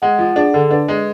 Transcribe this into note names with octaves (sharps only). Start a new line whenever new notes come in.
G#3 F#5
F3
D4 G#4
D3 A4
D4 B4
G#3